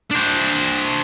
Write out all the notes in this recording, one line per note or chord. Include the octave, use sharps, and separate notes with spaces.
D4 C5